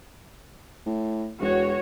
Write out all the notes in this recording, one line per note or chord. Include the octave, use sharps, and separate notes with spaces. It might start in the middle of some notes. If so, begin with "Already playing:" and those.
A2
E1 F#4 C#5